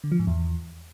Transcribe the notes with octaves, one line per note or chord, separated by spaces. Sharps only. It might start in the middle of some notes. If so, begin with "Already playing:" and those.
D3
F3
G#2
E2